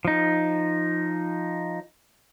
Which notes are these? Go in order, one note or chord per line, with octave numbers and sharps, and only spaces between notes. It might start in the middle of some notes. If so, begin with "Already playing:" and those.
F3 D#4